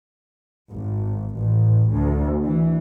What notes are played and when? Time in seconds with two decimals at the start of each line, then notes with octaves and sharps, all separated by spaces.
0.69 G#1
1.36 A1
1.91 D2
2.44 E3